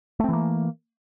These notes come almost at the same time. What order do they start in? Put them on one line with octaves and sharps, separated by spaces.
A3 C4 E3 A#3